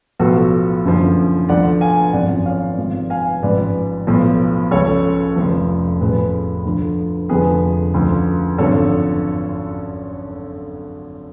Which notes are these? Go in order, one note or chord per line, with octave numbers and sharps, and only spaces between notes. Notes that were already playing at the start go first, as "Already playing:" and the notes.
B1 A2 F3 F#4 A4
F#1 F#2 D3 F3
D2 D3 F3 D5 F#5
F5 G#5
G#1 F#2 F3 D5 F#5
C#5 F5
G#1 G#2 F3
F5 G#5
A1 G#2 F3 B4 D5
B1 A2 F3
C#2 C#3 F3 A4 C#5
F1 F2 C#3 F3
A1 A2 F3 G#4 B4
D2 D3 F3
F1 F2 D3 F3 G#4 B4
D2 C#3 F3
G#1 F#2 D3 F3 A4 C#5